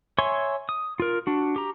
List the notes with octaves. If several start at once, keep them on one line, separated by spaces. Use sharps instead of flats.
C#5 E5 G#5 C6 C#6
D#6
F4 A#4
D4 F#4
G4 A#5